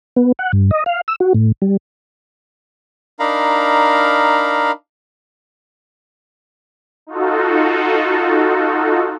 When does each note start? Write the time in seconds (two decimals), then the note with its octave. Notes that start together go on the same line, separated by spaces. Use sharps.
0.16 B3
0.39 F#5
0.53 G2
0.71 D#5
0.86 F5
1.08 E6
1.20 F#4
1.34 A2
1.62 G3
3.20 D4 D#4 A#4 F5 A#5 B5
7.07 D#4 F4 F#4 A4